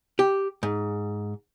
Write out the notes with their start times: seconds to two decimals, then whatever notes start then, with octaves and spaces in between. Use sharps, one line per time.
0.19 G4
0.63 G#2